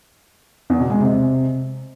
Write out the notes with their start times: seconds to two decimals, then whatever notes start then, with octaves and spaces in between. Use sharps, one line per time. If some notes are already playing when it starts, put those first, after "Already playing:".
0.70 E2
0.80 B2
0.90 G#3
1.00 C3